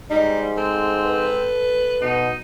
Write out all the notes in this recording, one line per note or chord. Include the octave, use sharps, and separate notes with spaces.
G#2 G3 D#4
C4 A4
B4
B2 D#4